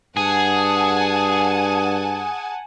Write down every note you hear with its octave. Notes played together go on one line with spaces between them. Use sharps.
G2 G#4 F#5 G#5 A5